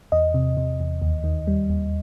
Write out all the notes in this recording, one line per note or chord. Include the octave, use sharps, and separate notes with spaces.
E2 D#5
C3
C3
E2
D#2
D#3
G3
D#2